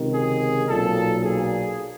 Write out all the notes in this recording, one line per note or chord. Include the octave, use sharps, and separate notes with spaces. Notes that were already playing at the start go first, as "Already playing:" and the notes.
Already playing: C#2 C3 D#3
G#4
B1 A#2 A4
G#4